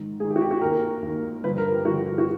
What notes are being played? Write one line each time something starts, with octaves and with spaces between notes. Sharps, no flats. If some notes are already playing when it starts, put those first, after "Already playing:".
Already playing: G#2 D#3
G#2 D#3 G#4
G4
F#4
G4
F#4
D#2 D#3 A#4
D#2 D#3
G2 D3 F3 B4
A#4
G4
G2 D3 F3 F#4
F#4